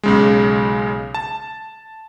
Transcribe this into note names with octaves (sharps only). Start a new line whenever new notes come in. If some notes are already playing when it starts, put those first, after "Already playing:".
B1 C#3 G#3
A5